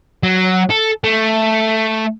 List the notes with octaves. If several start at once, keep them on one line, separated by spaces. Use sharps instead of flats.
F#3
A4
A3